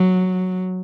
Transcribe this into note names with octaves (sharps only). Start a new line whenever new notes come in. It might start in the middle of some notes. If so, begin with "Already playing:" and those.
Already playing: F#3